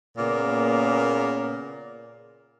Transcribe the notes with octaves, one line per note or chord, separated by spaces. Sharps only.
A#2 C#3 A#3 B3